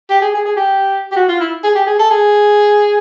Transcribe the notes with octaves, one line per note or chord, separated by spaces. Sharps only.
G4
G#4
G#4
G#4
G4
G4
F#4
F4
E4
G#4
G4
G#4
A4
G#4